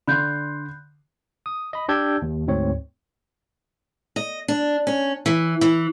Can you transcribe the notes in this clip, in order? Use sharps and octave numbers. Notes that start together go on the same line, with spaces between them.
D3 B5 C6 F#6 G6
D#6
D#5 B5
D4 G4 D5 E6 G6 G#6
D#2
D2 G#2 C4 C#5
D#5
D4
C#4
E3
E3